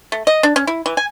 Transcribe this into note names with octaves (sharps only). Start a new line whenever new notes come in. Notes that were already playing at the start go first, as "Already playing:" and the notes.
A3
D#5
D4
C#4
E4
E3
G#5